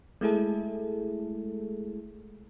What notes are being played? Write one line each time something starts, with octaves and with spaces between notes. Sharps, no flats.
G#3 A3 E4 G#4 A4